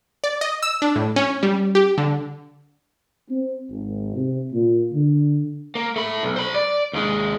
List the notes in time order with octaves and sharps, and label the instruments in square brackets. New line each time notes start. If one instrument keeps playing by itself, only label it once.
[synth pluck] D5
D#5
E6
D4
A2
C#4
G3
G4
D3
[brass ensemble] C4
G#1
C3
A#2
D3
[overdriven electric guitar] A#3
A3 B5
B1
C5 B5
D5
D#2 G#3